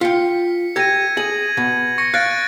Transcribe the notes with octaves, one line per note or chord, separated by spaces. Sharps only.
F4 G5 B6 C#7
G4 A4 G#6 A#6 D#7
G#4 F#7
B2
C#6 A#6 C#7
F5 F#6 A6 D7